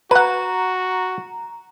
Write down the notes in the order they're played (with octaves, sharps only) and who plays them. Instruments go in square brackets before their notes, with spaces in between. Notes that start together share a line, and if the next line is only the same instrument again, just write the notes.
[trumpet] F#4 [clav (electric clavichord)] B4 F#5 [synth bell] A#5